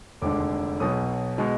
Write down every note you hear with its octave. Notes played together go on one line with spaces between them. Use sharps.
F1 D#2 D3 G#3 D6
B1 B2 F#3 D#6
B2 G#3